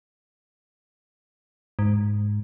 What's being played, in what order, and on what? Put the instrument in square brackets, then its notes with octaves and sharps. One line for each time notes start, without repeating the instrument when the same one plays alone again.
[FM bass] G#2